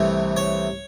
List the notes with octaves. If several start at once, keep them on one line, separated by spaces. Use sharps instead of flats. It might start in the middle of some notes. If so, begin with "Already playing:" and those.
Already playing: C2 C3 E3 A3 C#5
C#5